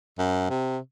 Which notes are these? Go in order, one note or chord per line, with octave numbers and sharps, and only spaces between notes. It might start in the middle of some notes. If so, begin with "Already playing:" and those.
F#2
C3